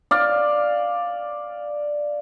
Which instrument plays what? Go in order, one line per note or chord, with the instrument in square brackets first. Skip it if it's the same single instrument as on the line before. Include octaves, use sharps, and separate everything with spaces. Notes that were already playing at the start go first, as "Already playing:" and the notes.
[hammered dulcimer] D5 F5